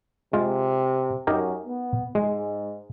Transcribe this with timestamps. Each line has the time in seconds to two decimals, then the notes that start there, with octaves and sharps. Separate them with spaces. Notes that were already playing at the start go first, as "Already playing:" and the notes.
0.33 C3 G#3 F4
1.27 F#2 D#4 G4 A#4
1.65 B3
2.15 G#2 G#3